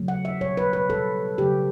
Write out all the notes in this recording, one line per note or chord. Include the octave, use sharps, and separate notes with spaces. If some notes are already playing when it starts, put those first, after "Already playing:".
Already playing: C#3 F#3 A3
F#5
E5
B2 G3 C#5
B4
B4
B2 G3 A4
C#3 F#3 A3 G4